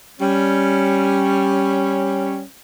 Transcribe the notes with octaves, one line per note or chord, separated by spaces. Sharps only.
G3 C#4